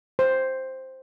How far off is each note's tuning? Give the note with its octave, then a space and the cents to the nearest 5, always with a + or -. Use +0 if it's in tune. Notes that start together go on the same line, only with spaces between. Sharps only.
C5 +5